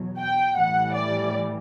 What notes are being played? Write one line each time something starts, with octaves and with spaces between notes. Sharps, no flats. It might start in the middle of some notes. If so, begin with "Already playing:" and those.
Already playing: E2 B2 F#3
G5
A2 E3 G3 F#5
D5